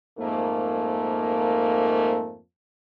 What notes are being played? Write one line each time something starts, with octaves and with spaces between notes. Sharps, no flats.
F2 G#2 A3 A#3